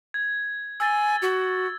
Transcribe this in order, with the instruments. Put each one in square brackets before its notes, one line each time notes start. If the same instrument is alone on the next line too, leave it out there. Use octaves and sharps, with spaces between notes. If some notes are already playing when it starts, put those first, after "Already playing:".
[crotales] G#6
[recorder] G#5 [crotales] E6 A6 G7
[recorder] F#4